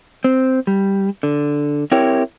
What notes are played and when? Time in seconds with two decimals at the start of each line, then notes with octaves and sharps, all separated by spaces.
0.24 C4
0.67 G3
1.23 D3
1.92 C4 E4 G4 A#4 C#5